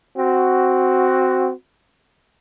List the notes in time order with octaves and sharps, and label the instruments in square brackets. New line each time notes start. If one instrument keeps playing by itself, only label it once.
[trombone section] C4 F#4